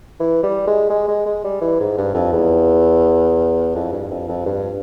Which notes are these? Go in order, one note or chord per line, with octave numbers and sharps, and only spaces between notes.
E3
G3
G#3
G#3
G#3
G#3
G3
E3
G#2
G2
F2
E2
F2
G2
F2
F2
G2